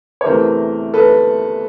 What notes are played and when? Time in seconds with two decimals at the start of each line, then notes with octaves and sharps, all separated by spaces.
0.21 C#5
0.26 E2 C3 E3 A3 A#4 C5
0.94 A4 B4